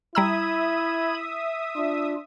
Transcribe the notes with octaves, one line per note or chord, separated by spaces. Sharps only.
G3 E4 E5 A#5 B5 D#6 E6 G#6
D4 F4